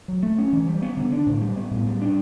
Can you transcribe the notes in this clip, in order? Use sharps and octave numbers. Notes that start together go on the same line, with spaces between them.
F#3
A3
C#4
E3
G3
B3
D3
D4
A2
G3
B3
A2
G3
D4